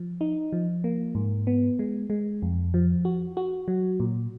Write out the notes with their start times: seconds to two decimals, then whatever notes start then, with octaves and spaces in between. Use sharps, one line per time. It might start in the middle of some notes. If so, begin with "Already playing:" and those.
Already playing: F3
0.21 D#4
0.53 F3
0.84 A#3
1.15 G#2
1.47 B3
1.79 G#3
2.10 G#3
2.42 F2
2.74 F3
3.05 F#4
3.37 F#4
3.68 F#3
4.00 A#2